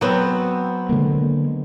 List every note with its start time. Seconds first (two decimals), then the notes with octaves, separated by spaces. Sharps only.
0.01 F#3 B3 C4
0.89 D3 G#3 A#3